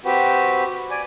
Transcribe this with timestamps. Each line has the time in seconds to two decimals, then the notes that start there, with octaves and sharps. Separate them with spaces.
0.05 C4 F#4 G4 B4
0.91 D5 G#5